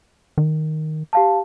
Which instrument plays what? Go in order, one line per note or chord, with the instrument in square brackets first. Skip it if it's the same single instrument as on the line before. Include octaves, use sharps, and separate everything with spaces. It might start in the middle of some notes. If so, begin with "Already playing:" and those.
[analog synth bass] D#3
[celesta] G4 F5 A5